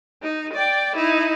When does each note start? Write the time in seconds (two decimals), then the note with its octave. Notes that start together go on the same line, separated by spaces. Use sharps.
0.23 D#4
0.53 D5 G5
0.96 D#4 E4